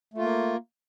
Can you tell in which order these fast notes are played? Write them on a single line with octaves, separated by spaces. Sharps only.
A3 F4 A#3